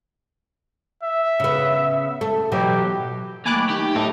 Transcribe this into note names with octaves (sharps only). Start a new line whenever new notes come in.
E5
C#3 B3
A3
B2 E3 F#3 G4
D#2 D#3 F#3 A3 G#5 B5 D6 F#6
D#4 G4
A2 D#4 A5